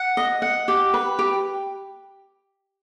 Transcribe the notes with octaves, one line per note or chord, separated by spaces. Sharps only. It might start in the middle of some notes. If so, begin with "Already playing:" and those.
Already playing: F#5
D#5
F#5
G4
B4
G4